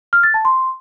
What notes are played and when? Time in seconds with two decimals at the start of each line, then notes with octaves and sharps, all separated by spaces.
0.13 F6
0.23 A6
0.34 A5
0.45 C6